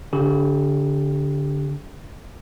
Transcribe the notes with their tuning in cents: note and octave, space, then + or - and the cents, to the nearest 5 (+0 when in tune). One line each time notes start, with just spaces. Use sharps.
D3 -30 G4 +0